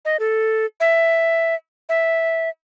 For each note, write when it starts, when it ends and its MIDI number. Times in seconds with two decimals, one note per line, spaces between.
0.05 0.17 75
0.20 0.66 69
0.80 1.55 76
1.89 2.49 76